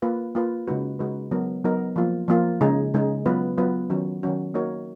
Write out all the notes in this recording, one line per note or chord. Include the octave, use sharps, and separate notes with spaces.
A#3 F4 B4
A#3 F4 B4
C#3 G#3 D#4 F#4 B4
C#3 G#3 D#4 F#4 B4
F#3 B3 D#4 A#4
F#3 B3 D#4 A#4
F3 A#3 F4
F3 A#3 F4
C#3 G#3 D#4 G#4
C#3 G#3 D#4 G#4
F#3 B3 F4 B4
F#3 B3 F4 B4
D#3 F#3 C#4 F#4
D#3 F#3 C#4 F#4
A#3 D#4 F#4 A#4 C#5